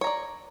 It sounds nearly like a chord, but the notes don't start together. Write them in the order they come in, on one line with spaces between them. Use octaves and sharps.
C#5 A#5 D5